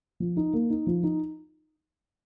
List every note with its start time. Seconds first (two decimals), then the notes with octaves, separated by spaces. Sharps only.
0.20 F3
0.37 D#4
0.53 A#3
0.70 D#4
0.87 F3
1.03 D#4